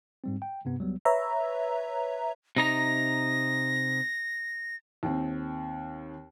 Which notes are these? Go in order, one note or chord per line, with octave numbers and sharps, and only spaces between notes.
G#2 G3 C4
G5
G2 C3 B3
C#2 F#3 G3 B3
B4 C#5 E5 A#5
C3 D#4 A#5 A#6
D#2 C4